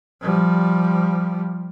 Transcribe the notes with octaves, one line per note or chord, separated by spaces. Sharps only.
F3 G3